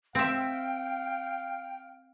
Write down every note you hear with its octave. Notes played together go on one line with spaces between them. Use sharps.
C4 E5 F5 G5